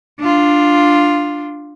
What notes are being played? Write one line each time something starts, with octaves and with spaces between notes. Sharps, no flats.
D4 F4